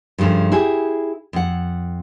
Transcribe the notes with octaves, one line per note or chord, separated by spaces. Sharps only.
G2 C#3 F3 A3
E4 G4 G#4
F2 F#5